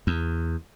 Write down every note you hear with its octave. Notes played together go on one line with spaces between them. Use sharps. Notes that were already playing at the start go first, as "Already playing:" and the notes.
E2